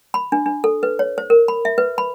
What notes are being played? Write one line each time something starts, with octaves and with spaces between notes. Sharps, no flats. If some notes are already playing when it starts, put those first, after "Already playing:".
B5
D4
D4
A4
B4
C#5
C5
A#4
B5
E5
B4
B5